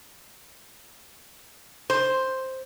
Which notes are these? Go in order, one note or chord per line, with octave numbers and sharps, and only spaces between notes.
C5